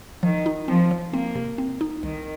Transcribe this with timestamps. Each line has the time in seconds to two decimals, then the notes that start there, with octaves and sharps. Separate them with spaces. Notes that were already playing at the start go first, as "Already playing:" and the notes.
0.23 D#3 F3
0.46 D#4
0.68 F3 C4
0.91 F3
1.13 A#3 C4
1.35 C3
1.58 C4
1.81 D#4
2.03 C2 D#3